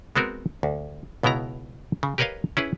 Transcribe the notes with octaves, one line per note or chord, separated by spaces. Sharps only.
G#3 B3 C4 F#4 A#4
D2
C#2 B2 B3 E4 A#5
C#3
G4 A#4 B4 C#5 D#5 F5
C#4 E4 G#4 B4